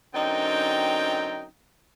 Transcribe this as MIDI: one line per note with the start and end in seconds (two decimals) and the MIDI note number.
0.14 1.45 42
0.14 1.45 50
0.14 1.45 60
0.14 1.45 63
0.14 1.45 79
0.14 1.45 82